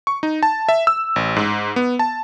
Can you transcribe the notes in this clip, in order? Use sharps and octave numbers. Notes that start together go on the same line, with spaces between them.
C#6
D#4
A5
E5
E6
A1
G#2
B3
A5